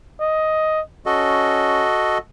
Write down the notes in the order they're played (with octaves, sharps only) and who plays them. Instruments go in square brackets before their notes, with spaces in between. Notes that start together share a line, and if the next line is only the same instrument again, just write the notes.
[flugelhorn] D#5
[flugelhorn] C#4 [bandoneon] F#4 A4 D#5